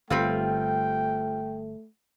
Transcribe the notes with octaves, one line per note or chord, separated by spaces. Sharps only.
G1 G3 A3 C4 F4 G5